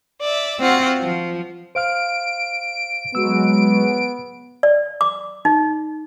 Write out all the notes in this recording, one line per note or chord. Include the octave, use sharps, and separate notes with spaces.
D5 E5
C4 F4 F#4 F#5
F3
C5 F5 F6 D7
F#3 G#3 B3 F#4 E6
D5
D6
D#4